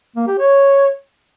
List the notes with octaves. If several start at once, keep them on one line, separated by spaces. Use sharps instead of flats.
A#3
G4
C#5